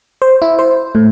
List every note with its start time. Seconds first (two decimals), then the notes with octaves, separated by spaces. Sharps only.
0.22 C5
0.42 E4
0.59 C5
0.95 A2